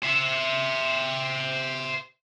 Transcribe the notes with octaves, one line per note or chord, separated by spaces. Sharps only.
C5 E5